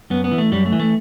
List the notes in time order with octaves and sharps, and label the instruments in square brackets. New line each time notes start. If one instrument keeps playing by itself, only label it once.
[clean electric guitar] F#2 B3
B3
E3
A3
F#2 G3
A3
E3
A3